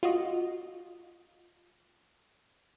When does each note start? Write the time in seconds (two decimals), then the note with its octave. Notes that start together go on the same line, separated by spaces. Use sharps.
0.03 F4 F#4 D#5